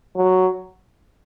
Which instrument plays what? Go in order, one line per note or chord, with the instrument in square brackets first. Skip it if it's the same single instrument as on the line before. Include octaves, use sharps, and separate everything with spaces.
[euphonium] F#3